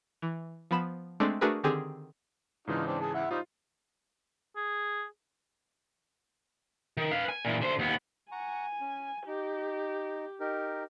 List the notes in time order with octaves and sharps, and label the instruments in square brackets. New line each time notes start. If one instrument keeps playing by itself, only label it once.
[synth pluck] E3
F3 B3 B5 E7
G#3 A3 C4 D4
A3 D4 F#4 G#4 A#4 B4
D3 D#3 C4 G4 G#4
[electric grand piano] G#2 C#3 E3 [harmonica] D4 D#4 F4
[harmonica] C4 D4
G#4 A5
E4 E5 F#5
[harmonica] G3 D#4 C5 [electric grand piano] F4
[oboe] G#4
[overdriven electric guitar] D#3
B4 F5
G#5
A#2 E3
D3 C5
D#2 B3
[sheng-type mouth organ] F#5 A#5 C#6 [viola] G#5
[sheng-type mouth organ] C#4
[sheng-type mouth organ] D#4 [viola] G4
[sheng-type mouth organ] D#4 G4 A#4